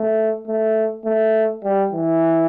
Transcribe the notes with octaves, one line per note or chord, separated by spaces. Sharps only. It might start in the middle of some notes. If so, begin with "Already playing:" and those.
Already playing: A3
A3
A3
G3
E3